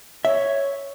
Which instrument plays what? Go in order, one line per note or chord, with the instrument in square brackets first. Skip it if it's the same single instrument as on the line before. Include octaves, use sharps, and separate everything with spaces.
[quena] C#5 [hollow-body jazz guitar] E5